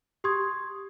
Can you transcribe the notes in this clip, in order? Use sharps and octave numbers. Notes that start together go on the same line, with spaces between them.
G4 C6 C#6 D#6 G#6